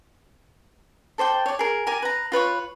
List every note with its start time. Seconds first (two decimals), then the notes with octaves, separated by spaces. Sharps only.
1.18 A4 C5 D5 G5
1.46 C#5 D5
1.59 G#4 A#4
1.86 G4 A#4 D5 G#5
2.02 B4 A#5
2.32 F4 B4 C#5 C#6